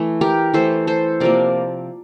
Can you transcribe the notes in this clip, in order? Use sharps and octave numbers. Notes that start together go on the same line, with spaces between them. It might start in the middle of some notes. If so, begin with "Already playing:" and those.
Already playing: E3 A3
G4 A#4
E3 A3 A4 C5
A4 C5
C3 F3 A#3 A#4 D5